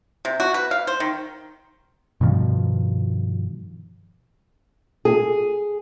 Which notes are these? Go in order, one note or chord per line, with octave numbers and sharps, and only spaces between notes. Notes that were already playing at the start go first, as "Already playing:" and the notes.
C3
F#4
B4
F5
C5
D#3
G2 B2 D#3 F3
G#4